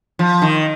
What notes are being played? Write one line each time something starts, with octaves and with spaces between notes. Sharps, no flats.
F3
D#3